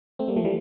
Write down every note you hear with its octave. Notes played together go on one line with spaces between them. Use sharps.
A3 C4
G3 A#3
F3 A3
E3 G3